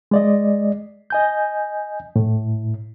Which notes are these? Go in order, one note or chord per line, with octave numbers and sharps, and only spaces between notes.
G#3 D5 D#5
D#5 G#5 G6
A2